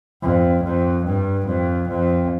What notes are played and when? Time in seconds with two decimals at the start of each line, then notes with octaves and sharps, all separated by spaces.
0.22 F2
0.64 F2
1.05 G2
1.47 F2
1.89 F2